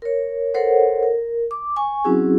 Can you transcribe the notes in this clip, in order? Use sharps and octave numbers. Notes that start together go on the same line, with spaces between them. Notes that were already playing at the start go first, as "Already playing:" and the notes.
A#4 C#5
A4 A#4 C5 C#5 F#5
A#4
D6
G#5 C#6
F#3 C4 C#4 E4 F#4 G#4